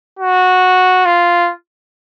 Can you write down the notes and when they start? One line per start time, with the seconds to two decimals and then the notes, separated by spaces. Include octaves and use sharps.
0.19 F#4
1.06 F4